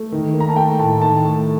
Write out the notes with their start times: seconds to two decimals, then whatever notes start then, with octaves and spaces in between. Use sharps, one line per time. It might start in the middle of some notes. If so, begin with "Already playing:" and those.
Already playing: A3
0.12 D#3
0.34 A#3
0.40 A#5
0.49 A5
0.56 A3 G5
0.79 A2 A5
1.02 D#3 A5
1.25 A3